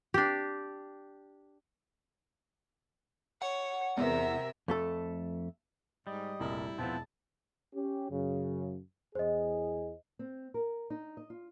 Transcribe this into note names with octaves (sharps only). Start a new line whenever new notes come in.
D4 G4
C#5 F#5
E2 C3 A#4 E5
F2 A3 A4
G#2 G3 D#5
F1 A#1 E4 A#4
E1 F3 B3 C4 A5
C#4 G4
F#2 C#3
E2 G#4 C5 D#5
C4
A#4
D#4
D#5
F4